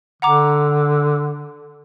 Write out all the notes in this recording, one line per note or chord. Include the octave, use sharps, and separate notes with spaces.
D3 F#5 A#5 D6